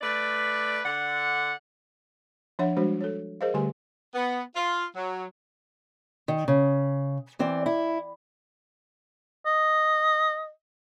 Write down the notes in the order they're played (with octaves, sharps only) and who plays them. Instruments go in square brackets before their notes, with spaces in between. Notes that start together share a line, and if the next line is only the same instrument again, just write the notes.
[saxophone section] A3 B4 D5
D3 F#5
[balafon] F3 D4 C#5 E5 F#5
F3 G3 G#3 D4 F#4 C5
A4 C#5
G#4 A#4 C5 D#5 F5
D3 G3 A3 G4 G#5 C6
[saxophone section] B3
F4
F#3
[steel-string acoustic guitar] D#3
C#3
E3 C4 D5
E4
[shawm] D#5